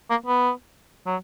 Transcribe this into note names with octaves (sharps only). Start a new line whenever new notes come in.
A#3
B3
F#3